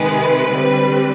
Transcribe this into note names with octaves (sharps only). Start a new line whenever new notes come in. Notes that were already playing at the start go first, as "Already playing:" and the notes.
Already playing: C3 D#3 G#3 B4
D3 G3 C4